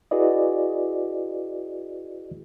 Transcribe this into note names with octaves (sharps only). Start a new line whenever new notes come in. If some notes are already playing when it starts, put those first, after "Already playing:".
E4 F#4 G#4 B4 D5 D#5